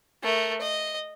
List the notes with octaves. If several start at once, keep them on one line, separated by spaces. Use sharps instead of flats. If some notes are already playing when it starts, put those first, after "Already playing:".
A3 A#4
D#5